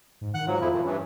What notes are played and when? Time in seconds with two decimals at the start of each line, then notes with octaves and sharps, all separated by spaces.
0.21 G#2
0.34 D#3 F#5 F#6
0.47 G#2 F#3 F4
0.61 F2 F3 E4
0.73 B2 D#3 E3
0.85 G2 E3 C#4